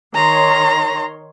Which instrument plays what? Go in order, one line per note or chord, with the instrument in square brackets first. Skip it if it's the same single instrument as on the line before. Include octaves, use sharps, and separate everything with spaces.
[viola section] D#3 C#5 C6 [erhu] A#5